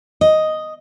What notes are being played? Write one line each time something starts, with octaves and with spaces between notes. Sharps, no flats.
D#5